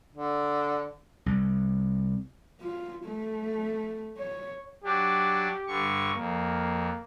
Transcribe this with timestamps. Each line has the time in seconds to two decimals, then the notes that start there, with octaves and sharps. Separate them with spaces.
0.15 D3
1.26 C2
2.61 F4
3.06 A3
4.17 C#5
4.84 F#3 D4 G4
5.67 G2 D3 C#6
6.16 F2 A#3